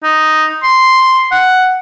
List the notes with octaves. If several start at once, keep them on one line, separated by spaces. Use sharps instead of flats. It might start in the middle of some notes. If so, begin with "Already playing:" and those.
D#4
C6
F#5